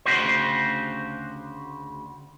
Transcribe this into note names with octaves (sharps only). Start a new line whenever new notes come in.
D2 C#3 F#4 G4 C5